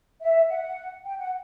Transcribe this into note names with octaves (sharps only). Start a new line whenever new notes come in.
E5
F#5
G5
F#5